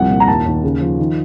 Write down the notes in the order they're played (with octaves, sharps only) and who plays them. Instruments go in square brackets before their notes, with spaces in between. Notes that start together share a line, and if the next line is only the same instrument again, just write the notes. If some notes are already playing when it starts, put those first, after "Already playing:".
Already playing: [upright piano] C2 F3 F#5
A#2
A#5
D#2 A5
D#2
C#3
F3
D#3